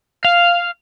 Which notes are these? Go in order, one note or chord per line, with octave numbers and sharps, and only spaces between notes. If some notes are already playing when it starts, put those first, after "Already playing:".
F5